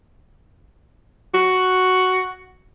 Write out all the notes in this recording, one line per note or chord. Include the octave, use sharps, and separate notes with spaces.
F#4